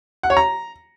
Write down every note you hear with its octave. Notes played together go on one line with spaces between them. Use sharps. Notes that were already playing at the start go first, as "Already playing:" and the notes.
F#5
C#5
A#5